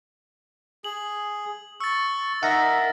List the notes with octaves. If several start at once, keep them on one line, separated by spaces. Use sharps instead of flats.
G#4 F#7
C#6 E6 A6
D#4 A#4 E5 F#5 A#6